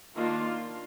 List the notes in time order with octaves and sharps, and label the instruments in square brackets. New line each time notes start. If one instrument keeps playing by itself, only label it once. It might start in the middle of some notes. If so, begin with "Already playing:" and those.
[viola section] D#3 A#3 D4 F4